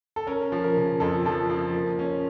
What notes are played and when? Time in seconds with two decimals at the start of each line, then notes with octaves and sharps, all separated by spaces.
0.16 A4
0.27 C#4 A#4
0.52 F3
0.64 A#4
0.77 C#3
1.00 F2 A4
1.25 F3 A4
1.50 F3
1.74 A#3
1.99 C#4